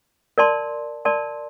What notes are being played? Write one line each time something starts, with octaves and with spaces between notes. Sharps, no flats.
A#4 D5 A5 C6
A#4 D5 A5 C6